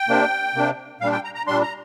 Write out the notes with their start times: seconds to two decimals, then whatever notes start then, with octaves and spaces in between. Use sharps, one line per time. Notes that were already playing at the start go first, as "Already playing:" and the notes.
Already playing: G5
0.08 C3 A#3 D4
0.55 C3 A#3 D4
1.01 A#2 G3 D4 F5
1.12 G5
1.24 A#5
1.35 A#5
1.47 A#2 G3 D4 C6
1.62 A#5